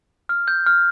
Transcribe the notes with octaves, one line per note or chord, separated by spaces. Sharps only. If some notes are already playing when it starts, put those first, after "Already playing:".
F6
G6
F6